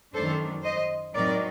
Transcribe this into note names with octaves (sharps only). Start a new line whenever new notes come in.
F#2 D#3 A3 D4 A4 C5
C5 D#5
A2 F#3 C4 D#4 A#4 D5